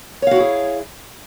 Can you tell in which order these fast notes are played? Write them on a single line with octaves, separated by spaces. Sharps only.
C#5 F5 F#4 E4 G#4